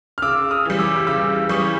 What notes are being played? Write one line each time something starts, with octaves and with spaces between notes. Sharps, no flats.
F6
C#3 D6 E6
D#6 F6
E3 G3
D6 E6
C#3 D6 E6
E3 G3 C#6 D#6